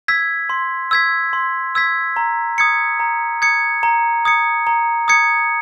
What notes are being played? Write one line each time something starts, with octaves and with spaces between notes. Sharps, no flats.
E6 G#6 B6
C6
E6 G#6 B6
C6
E6 G#6 B6
A#5
D#6 G#6 C#7
A#5
D#6 G#6 C#7
A#5
D#6 G#6 C#7
A#5
D#6 G#6 C#7